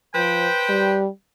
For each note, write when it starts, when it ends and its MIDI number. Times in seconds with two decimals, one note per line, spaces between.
0.15 0.48 53
0.15 0.98 71
0.15 0.98 72
0.15 0.98 79
0.69 1.08 55